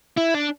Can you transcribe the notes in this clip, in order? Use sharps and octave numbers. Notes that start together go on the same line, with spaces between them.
E4
D4